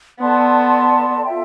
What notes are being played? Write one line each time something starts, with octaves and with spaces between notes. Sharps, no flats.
B3 A4 D5 A5 C6
F4 A4 E5 G5